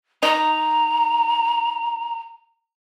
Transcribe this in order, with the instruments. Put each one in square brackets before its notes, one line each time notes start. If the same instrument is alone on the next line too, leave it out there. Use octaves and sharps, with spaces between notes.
[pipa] D#4 [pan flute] A#5